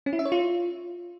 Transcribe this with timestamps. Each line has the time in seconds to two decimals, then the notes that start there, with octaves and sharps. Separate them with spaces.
0.06 C#4
0.13 E4
0.19 E5
0.25 C#5
0.32 F4